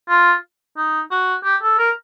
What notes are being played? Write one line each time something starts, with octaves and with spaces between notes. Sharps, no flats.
F4
D#4
F#4
G4
A4
A#4